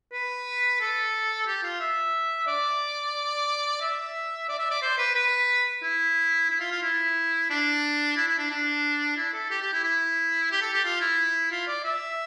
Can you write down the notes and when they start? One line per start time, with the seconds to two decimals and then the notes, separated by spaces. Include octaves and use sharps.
0.13 B4
0.81 A4
1.47 G4
1.63 F4
1.80 E5
2.47 D5
3.81 E5
4.49 D5
4.59 E5
4.71 D5
4.83 C5
4.98 B4
5.15 B4
5.82 E4
6.50 E4
6.60 F4
6.72 F4
6.82 E4
7.50 D4
8.17 E4
8.28 E4
8.38 D4
8.51 D4
9.17 E4
9.33 A4
9.50 G4
9.62 G4
9.73 E4
9.84 E4
10.52 G4
10.62 A4
10.73 G4
10.85 F4
11.01 E4
11.52 F4
11.68 D5
11.84 E5